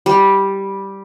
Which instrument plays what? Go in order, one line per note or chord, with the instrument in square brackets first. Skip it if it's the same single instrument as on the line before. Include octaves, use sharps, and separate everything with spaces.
[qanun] G3